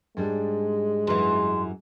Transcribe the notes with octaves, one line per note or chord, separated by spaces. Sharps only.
G#2 G3 G#3 D4
F#2 E3 C6